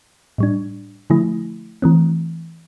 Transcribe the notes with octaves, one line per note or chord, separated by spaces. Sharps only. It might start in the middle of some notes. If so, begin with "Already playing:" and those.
A2 G3 D4
D3 F3 A3 E4
E3 A3 C4